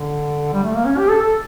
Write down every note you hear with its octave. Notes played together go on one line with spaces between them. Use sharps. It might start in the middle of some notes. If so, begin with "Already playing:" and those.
Already playing: D3
G3
A3
A#3
C#4
G4
A4
A4